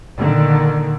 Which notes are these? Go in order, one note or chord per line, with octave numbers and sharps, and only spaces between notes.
A#2 D3 D#3